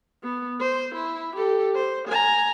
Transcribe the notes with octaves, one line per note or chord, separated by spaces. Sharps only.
B3
C5
E4
G4 A4
C5
G#5 A#5